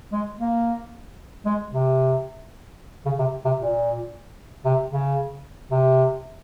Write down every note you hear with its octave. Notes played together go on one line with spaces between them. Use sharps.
G#3
A#3
G#3
C3
C#3
C3
C3
A#2
C3
C#3
C3